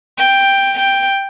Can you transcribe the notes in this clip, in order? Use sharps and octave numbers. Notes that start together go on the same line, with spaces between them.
G5
G5